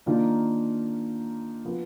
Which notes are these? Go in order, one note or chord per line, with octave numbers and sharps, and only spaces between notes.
D#3 A#3 D4 F4
F3 B3